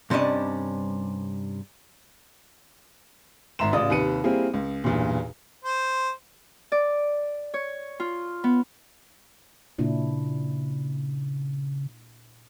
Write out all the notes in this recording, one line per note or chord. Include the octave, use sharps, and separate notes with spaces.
G2 C3 G3 C#4 D4 D#5
G#1 E5 A#5 C6 E7
A1 C#3 F4 D5 D#6
D#2 C3 B4 C#7 D#7
G3 A#3 C4 E4 G#4
C#2
B1 E2 G2 A#2
C5
D5
C#5
F4
B3
A#2 C#3 D4 E4